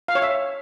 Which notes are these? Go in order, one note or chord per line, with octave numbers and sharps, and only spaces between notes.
F5
C#5
E5